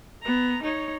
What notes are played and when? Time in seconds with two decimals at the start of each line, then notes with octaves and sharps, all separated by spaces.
0.23 B3 A#5
0.63 D#4 C#5